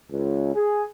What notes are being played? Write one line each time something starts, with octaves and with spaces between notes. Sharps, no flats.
C#2
G#4